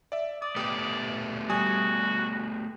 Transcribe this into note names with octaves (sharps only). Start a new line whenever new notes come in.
D5 E5
D5 D#6
A3 B3 G4 D6 D#6
G3 F#4 G#5 D#6